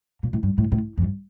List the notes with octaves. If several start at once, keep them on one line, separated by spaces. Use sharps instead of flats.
A#2
A2
G2
A2
A2
F2
G2